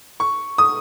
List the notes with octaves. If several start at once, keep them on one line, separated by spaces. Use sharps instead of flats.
C#6
D#6